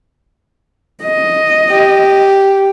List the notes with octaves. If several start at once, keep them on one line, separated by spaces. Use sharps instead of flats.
D#5
G4